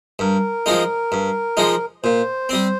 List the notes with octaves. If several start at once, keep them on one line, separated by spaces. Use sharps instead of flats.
G2 A#4
F3 G#3 D#4
G2
F3 G#3 D#4
A#2 C5
G3 C4